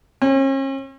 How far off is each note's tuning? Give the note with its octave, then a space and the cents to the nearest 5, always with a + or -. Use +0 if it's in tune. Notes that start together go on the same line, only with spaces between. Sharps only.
C#4 -40